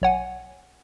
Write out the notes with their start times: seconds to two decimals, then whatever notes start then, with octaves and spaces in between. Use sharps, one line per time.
0.02 B1 C#5 F#5 G#5